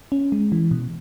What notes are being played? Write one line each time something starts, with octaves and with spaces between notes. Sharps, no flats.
C#4
G#3
E3
B2